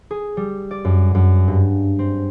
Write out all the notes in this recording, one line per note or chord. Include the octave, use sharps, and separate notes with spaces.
G#4
G3
D5
F#2
F#2
G2
C4